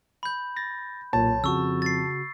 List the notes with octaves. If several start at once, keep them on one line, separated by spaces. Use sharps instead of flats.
B5 G6
A6 A#6
B1 A#2 C#5 A5
F2 C#3 F#4 C#6 E6
A6 C7